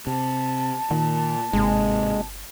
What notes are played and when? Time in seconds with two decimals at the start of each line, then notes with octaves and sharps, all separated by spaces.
0.07 C3 A5
0.91 A#2 D#3
1.53 G1 G#2 C3 G#3